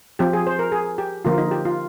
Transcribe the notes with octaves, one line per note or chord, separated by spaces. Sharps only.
F3 C4 G4
G#4
C5
A#4
G#4
G4
D3 F3 A#3 F4
D#4
G4
F4